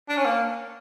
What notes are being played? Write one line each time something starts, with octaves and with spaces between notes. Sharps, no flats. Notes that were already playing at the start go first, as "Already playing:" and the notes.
D4
C#4
A#3